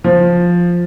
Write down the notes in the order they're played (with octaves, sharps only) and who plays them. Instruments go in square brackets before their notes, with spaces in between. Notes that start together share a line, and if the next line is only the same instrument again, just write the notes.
[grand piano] F3